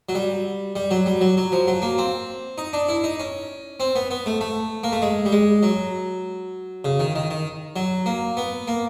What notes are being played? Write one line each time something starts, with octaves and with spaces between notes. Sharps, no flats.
F#3
G3
G3
F#3
G3
F#3
F#3
F3
F#3
A#3
C4
D#4
D4
E4
D#4
C#4
C4
B3
B3
A3
A3
A#3
A3
G#3
G3
G#3
F#3
C#3
D#3
D#3
D#3
F#3
A#3
B3
A#3